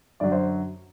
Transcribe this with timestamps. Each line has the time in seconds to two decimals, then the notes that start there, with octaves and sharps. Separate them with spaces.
0.20 F#2 D3 F#3 D5
0.32 C5